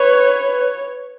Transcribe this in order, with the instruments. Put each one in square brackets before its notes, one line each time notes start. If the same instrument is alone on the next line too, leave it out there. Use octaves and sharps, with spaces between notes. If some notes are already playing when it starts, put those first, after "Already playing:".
Already playing: [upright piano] B4 [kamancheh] C#5